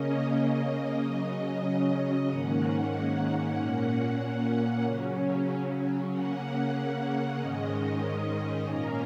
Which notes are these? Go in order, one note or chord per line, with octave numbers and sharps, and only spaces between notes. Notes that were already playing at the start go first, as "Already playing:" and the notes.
Already playing: C#3 A#3 C#4 D#5
C#3 F#3 C#4
G#2 D#3 A#3 C#4 F#5
A#2 A#3 C#4 F#5
C#3 F#3 C#4
C#3 A#3 C#4 F#5
G#2 D#3 G#3 C#4 D#5
A#2 A#3 C#4 A#4